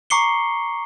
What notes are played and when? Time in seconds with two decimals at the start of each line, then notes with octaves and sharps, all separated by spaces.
0.10 A#5 C#6 D6 C7 C#7 G7